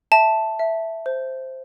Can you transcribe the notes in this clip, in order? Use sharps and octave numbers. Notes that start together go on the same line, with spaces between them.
E5 A5
E5
C5